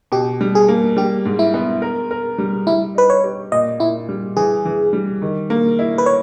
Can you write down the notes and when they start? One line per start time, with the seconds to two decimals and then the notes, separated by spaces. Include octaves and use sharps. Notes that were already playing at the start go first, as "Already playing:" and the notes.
0.12 B2 G4
0.41 G3
0.55 G#4
0.68 A#3
0.97 G3 G4
1.25 G#2
1.39 E4
1.54 B3
1.82 A#4
2.11 A#4
2.38 G3
2.67 G3 E4
2.95 D#4 B4
3.10 C#5
3.24 G4
3.52 A#2 D#5
3.80 A#2 E4
4.09 G3
4.37 E3 G#4
4.65 E3
4.93 G3
5.22 D#3
5.50 A#3
5.79 E4
5.98 B4
6.06 C#5